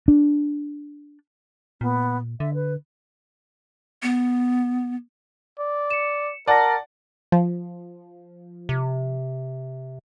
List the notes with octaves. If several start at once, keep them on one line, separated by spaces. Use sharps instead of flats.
D4
A#2 B3
D3 E5
B4
B3
D5
C#7 E7
A#4 D5 F#5 A5 A#6
F3
C3